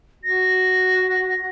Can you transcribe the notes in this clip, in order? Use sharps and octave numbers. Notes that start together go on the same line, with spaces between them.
F#4 A#6